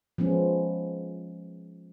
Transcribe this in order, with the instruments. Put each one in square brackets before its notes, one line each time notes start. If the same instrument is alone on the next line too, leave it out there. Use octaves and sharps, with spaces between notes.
[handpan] F3 G#3 B3 C#4